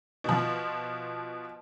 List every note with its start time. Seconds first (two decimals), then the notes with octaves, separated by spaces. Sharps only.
0.24 B2 F3